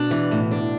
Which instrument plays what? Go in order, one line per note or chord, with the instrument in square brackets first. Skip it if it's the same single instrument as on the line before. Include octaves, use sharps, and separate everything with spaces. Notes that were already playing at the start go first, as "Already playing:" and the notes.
Already playing: [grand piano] B2 [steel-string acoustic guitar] D4
[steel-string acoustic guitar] E3
A2
D4